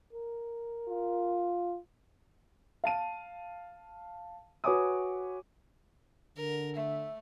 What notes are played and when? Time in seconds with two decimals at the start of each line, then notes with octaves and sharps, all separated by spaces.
0.13 A#4
0.88 F4
2.84 F5 A5 D#7
4.64 F#4 B4 C#5 G#5 D6 D#6
6.37 D3 A#4
6.76 A3 E5